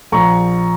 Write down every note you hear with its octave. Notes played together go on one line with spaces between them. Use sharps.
A#1 A#5 C#6